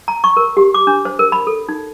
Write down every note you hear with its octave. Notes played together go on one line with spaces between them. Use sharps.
A#5
C#6
A#4
G4
D6
D4
C5
A#4
B5
A4
D#4